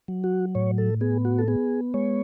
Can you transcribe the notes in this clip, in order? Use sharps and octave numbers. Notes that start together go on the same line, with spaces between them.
F#3
F#4
A2 C#5
A4
B3 G#4
F#4
A4
B3 G#4
G#3 C#5